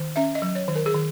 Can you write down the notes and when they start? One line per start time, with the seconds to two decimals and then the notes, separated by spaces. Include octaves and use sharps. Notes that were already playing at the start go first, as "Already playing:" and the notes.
Already playing: D#3
0.16 C#4 E5
0.35 D#5
0.42 F#3
0.55 C#5
0.68 D#3
0.75 A#4
0.86 G#4
0.94 D#3